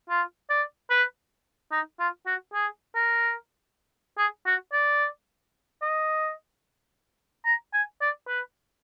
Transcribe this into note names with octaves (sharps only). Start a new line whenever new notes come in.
F4
D5
B4
D#4
F4
F#4
G#4
A#4
G#4
F#4
D5
D#5
A#5
G#5
D5
B4